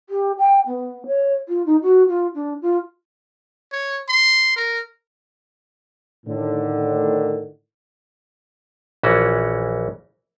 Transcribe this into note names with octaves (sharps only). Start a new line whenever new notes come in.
G4
G5
B3
C#5
F4
D#4
F#4
F4
D4
F4
C#5
C6
A#4
A2 D3 D#3
A#1 E3 C#4 F#4